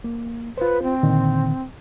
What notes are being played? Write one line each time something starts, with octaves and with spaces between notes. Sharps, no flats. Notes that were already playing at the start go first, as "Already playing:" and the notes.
A#3
F4 B4 C5
C4
A#2 D3 D#3